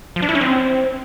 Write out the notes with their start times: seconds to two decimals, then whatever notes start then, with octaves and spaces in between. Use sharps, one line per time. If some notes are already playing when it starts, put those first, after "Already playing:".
0.16 F3
0.22 D4
0.29 E4
0.35 C#4
0.41 C4